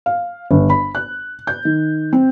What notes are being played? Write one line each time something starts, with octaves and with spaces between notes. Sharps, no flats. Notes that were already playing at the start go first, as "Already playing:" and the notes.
F5
G1
B5
F#6
G6
D#3
C4